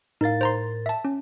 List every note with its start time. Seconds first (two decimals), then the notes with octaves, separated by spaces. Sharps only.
0.21 A2 D#4 A#4 F5 A6
0.41 C5 A#5 C6
0.86 E5 A5
1.05 C#4